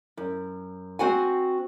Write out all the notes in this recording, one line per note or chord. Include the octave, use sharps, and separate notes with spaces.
F#2
C4 F#4 C5 F#5 G#5